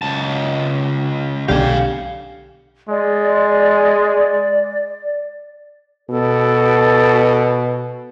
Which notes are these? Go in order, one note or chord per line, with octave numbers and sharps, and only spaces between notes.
C#2 A5
B1 D3 G4 F5 G#5
G#3 D5
B2 A4